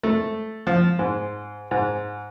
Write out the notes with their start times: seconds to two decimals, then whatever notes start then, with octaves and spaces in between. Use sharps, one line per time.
0.03 A3
0.67 F3
0.99 G#2
1.71 G#2